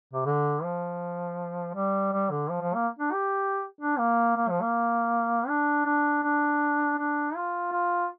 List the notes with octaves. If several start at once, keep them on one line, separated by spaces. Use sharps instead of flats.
C3
D3
F3
G3
G3
D3
F3
F3
A#3
D4
G4
D4
A#3
A#3
F3
A#3
D4
D4
D4
D4
F4
F4